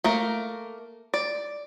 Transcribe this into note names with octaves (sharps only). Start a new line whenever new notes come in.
A3 A#3 A#4
D5